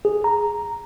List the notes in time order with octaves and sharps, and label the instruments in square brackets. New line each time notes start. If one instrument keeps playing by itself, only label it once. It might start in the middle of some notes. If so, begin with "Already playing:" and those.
[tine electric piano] G#4
A#5